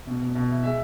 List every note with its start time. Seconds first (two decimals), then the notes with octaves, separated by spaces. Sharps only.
0.07 B2
0.21 B2
0.35 B2
0.50 E4
0.64 G#3 E5